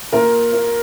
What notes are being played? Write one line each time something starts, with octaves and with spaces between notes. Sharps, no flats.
A#2 A#4
A#3